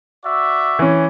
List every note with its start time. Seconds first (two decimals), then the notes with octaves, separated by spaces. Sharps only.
0.25 F#4 D5 E5
0.79 E3 C#4